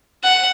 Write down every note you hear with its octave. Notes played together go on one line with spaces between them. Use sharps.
F#5